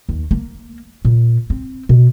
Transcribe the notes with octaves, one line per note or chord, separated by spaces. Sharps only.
D#2
A#3
A#2
C4
B2